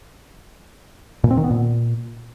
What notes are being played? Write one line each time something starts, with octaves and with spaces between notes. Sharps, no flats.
A#2
C4
D#3
B3
A#2